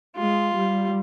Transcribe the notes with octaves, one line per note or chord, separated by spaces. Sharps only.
G#3 F4
G3